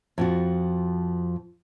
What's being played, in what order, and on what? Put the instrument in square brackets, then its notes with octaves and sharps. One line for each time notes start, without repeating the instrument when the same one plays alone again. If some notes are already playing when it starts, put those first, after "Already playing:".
[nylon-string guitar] F2 F3 F#4